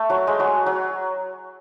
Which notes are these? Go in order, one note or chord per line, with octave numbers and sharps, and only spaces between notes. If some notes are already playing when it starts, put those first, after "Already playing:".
Already playing: A3
F#3
G#3
F#3
F#3